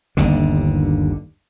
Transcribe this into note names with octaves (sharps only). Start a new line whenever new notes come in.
G1 D#2 D3